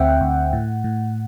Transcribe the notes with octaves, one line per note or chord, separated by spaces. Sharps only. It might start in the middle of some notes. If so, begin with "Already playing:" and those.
Already playing: D2 C4 E5 F#5 G5
D2
A2
A2